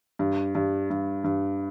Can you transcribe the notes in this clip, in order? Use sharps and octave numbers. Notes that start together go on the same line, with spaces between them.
G2
G2
G2
G2